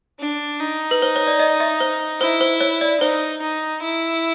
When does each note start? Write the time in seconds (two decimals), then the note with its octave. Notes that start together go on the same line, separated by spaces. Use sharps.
0.20 D4
0.60 D#4
0.91 B4
1.02 C5
1.16 C#5
1.27 D5
1.39 D#5
1.60 E5
1.80 C5
2.21 E4 C5
2.41 C5
2.61 C#5
2.81 D5
3.01 D#4 C5
3.42 D#4
3.82 E4